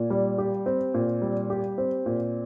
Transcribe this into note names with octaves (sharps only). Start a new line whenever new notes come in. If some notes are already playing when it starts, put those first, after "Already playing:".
Already playing: A#2
G3
G4
C4
A#2
G3
G4
C4
A#2